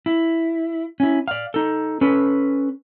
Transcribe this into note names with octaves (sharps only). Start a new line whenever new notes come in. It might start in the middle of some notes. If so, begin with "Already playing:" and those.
E4
C#4 E4
D5 F5
D#4 A4
C#4 A4 B4